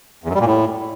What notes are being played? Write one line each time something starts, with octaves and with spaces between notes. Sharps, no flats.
E2
F#2
G3
A#2
A2